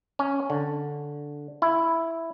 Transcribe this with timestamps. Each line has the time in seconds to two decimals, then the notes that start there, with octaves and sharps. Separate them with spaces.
0.19 C#4
0.50 D3
1.62 E4